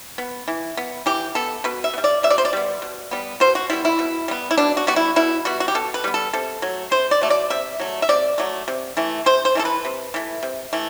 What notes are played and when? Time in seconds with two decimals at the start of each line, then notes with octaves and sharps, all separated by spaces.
0.18 B3
0.48 E3
0.77 B3
1.06 E3 G4
1.35 B3 A4
1.64 B2 B4
1.84 E5
1.94 B3
1.98 G3
2.04 D5
2.23 B2 E5
2.30 D5
2.38 C5
2.45 D5
2.53 G3 B3
2.82 B2
3.11 G3 B3
3.40 B2 C5
3.55 F#4
3.70 G3 B3 E4
3.85 E4
3.99 B2
4.28 G3 B3
4.51 E4
4.58 B2 D4
4.77 F#4
4.87 G3 B3 F#4
4.96 E4
5.16 B2 E4
5.45 G3 B3 F#4
5.60 F#4
5.68 G4
5.75 B2 A4
5.94 B4
6.04 G3 B3
6.14 A4
6.33 C3 A4
6.62 F#3 A3
6.91 C3 C5
7.11 D5
7.22 F#3 A3
7.30 D5
7.50 C3 E5
7.80 F#3 A3
8.02 E5
8.09 C3 D5
8.38 F#3 A3
8.68 C3
8.97 E3 A3
9.26 C3 C5
9.45 C5
9.55 E3 A3 A4
9.65 B4
9.85 C3
10.14 E3 A3
10.43 C3
10.73 E3 A3